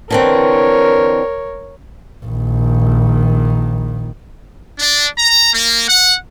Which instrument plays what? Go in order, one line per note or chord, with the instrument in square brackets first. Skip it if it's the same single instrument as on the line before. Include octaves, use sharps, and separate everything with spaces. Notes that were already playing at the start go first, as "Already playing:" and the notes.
[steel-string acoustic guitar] D3 E3 C4 [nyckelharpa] A#4 C#5
[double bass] A#1 D#3
[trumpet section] D4
A#5
A#3
F#5